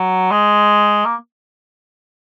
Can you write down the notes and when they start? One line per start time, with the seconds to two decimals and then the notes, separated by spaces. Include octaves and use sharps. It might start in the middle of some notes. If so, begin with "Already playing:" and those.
Already playing: F#3
0.31 G#3
1.05 A#3